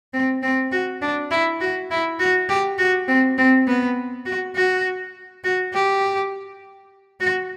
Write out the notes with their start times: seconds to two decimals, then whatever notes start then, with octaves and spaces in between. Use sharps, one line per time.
0.14 C4
0.43 C4
0.72 F#4
1.02 D4
1.31 E4
1.61 F#4
1.91 E4
2.19 F#4
2.49 G4
2.79 F#4
3.08 C4
3.38 C4
3.67 B3
4.26 F#4
4.56 F#4
5.44 F#4
5.73 G4
7.20 F#4